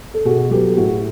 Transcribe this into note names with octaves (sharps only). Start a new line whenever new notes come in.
A4
B2 F#4 G#4
F#3 B3 G4 A4
A4
A2 F#4 G#4